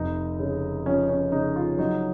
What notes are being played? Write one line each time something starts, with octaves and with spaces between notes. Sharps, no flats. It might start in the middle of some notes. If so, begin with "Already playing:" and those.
Already playing: F1 D#4
C#3
F3 C#4
C#4
C#3 D#4
F4
F#3 D#4